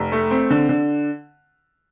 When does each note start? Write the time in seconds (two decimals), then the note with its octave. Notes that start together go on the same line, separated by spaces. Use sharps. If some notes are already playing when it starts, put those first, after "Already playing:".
Already playing: F1
0.12 A3
0.31 C4
0.50 D3
0.69 D3